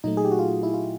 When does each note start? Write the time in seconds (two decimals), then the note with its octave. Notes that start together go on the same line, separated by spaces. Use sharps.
0.04 A#2 F#3 A3 D#4
0.17 G#4
0.25 G4
0.31 F#4
0.39 F4
0.63 E4
0.74 F4